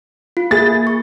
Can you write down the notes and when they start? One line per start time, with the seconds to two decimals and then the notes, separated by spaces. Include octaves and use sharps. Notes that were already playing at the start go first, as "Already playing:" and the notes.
0.37 F4
0.51 A#3 G#4 A6
0.87 C#6